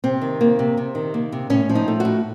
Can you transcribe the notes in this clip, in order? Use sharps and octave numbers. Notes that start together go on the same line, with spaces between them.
C3 C4
D#3
A#3
C3
C3
D#3
A#3
C3
A2 C#4
F3
D#4
A3
A2 F#4